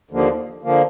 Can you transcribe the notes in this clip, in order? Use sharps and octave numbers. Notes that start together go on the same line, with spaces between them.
D#2 D3 F3 A#3
D3 F3 A#3